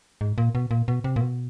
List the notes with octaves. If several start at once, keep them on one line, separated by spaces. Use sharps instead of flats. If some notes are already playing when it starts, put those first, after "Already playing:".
G#2
A#2
B2
A#2
B2
C3
A#2
B2